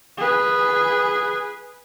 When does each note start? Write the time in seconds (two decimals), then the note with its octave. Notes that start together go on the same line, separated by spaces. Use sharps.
0.18 G#4 B4